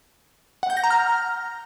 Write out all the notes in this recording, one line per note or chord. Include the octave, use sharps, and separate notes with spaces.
F#5
G6
A#6
A#5
F6